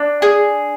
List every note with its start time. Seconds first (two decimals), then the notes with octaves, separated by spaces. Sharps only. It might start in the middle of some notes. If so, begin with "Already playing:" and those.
Already playing: D4
0.22 G#4